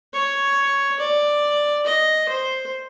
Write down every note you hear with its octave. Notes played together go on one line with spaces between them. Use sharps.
C#5
D5
D#5
C5